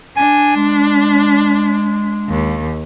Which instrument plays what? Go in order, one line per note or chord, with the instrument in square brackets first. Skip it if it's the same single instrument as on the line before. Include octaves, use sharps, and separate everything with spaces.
[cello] D4 [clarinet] G#5
[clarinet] G#3
[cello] D#2